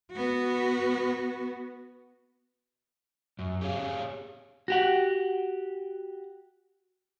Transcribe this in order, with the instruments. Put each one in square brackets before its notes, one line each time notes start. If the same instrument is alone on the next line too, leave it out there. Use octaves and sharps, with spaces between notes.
[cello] B3 F#4
[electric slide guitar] F#2
G4 G#4 C#5 F5
[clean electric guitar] F#4 G4 F#5